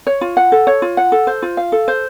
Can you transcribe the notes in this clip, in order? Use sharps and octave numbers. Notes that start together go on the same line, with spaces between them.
C#5
F4
F#5
A4
C#5
F4
F#5
A4
C5
F4
F5
A4
C5